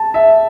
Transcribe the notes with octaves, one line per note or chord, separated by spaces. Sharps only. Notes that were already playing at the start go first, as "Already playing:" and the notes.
Already playing: A5
E5